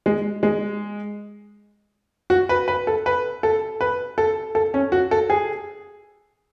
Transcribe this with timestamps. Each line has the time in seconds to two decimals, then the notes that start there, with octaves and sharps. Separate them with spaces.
0.06 G#3
0.43 G#3
2.30 F#4
2.49 B4
2.68 B4
2.87 A4
3.06 B4
3.43 A4
3.81 B4
4.18 A4
4.55 A4
4.74 C#4
4.92 F#4
5.11 A4
5.30 G#4